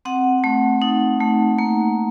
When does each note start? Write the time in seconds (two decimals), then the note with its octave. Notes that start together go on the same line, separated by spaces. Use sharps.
0.05 C4 F#5
0.44 A3
0.82 D#4
1.20 A3
1.59 A#3